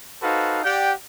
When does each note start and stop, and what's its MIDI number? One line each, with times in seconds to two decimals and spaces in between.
0.22 0.59 63
0.22 0.59 66
0.22 0.59 69
0.22 0.59 71
0.22 0.59 72
0.22 0.59 77
0.63 0.92 67
0.63 0.92 74
0.63 0.92 78
0.63 0.92 79